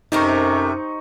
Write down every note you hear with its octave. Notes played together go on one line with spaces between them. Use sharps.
F#2 C3 A3 C4 D#4 A#4 C#6